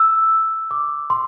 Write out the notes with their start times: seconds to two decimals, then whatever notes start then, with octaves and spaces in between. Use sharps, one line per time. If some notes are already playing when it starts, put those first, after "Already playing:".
Already playing: E6
0.71 D6
1.10 C6